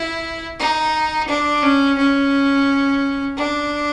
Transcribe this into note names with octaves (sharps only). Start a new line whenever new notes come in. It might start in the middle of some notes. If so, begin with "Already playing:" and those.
Already playing: E4
D#4
D4
C#4
C#4
D4